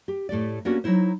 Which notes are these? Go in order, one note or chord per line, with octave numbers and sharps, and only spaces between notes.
G4
A2 A3 G4 D5
A#3 B3 C#4 D4 F#4 G4
F#3 G#3 D#4 E4 C5